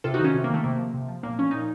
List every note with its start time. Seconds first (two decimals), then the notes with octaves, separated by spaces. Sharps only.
0.04 C3 F4 A4
0.14 D#4 F#4
0.19 D#3
0.24 C#4 F4
0.34 C3
0.44 A#3
0.50 D#3 A3
0.64 C3 A#3
0.79 F3
0.94 C3
1.08 F3
1.23 A#2 A#3
1.38 F3 C#4
1.51 A#2 D#4